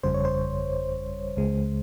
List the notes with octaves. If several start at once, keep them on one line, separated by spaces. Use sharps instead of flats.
G1 F2 C#3 G3 C5
C#5
C5
C#2 C#3 G#3